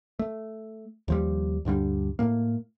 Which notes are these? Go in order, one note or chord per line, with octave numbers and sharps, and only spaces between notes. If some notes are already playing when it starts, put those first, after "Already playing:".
A3
D#2 F3 G3
D2 G2 D3 G3
A2 A#3